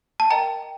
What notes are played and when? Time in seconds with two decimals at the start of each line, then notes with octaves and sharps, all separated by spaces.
0.20 A5
0.30 A#4 D#5 G5 A#5
0.63 G5